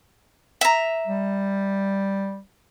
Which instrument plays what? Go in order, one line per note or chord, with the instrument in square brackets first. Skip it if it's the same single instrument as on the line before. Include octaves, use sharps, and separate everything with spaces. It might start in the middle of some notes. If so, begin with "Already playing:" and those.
[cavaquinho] E5 A#5
[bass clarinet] G3